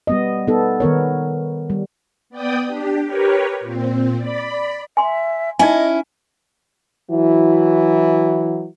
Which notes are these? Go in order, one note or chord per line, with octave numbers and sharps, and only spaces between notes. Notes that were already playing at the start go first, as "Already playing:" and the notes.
G3 B3 D#5
B3 D#4 A4
D#3 B3 A#4 C#5
G3
B3 D5 G5 D#6
D4 G4
G4 A#4 B4 C#5
A#2 C4
D5 B5
E5 G#5 C6
C#4 D#4 E4 D#5 G#5
E3 F#3 E4 F#4